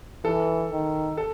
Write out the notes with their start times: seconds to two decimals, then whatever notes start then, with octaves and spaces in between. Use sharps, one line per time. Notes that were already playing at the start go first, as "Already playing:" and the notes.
0.25 E3 A4
0.72 D#3
1.17 A4